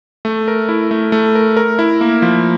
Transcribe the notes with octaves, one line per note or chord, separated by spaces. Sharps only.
A3
A#4
E4
A3
A3
A#4
A#4
E4
A#3
F3